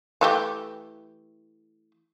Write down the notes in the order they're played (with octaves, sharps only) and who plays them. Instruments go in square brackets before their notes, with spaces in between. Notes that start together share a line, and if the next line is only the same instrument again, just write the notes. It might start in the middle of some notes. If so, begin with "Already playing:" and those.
[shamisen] E3 A3 G4